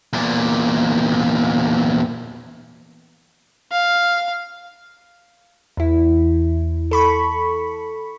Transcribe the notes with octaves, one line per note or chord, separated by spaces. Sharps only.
E2 A#2
F5
E2 E4
A4 B5 C#6